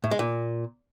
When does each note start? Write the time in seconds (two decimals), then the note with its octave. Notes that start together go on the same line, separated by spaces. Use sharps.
0.04 A2
0.11 G#3
0.19 A#2